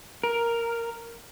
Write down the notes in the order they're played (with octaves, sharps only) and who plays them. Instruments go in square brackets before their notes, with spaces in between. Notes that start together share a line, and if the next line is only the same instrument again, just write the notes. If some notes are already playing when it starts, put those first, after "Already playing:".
[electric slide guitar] A#4